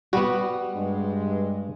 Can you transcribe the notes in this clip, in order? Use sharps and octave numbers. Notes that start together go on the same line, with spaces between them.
G3 B3 F#4
G2 G#3